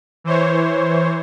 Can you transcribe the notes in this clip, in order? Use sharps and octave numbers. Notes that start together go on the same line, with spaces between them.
E3 C5 C#5